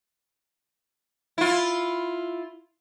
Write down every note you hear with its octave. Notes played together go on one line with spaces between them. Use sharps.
E4 F4